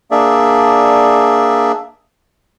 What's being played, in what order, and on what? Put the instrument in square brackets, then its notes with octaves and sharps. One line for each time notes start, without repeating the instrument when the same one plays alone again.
[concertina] A#3 D4 G#4 D5 E5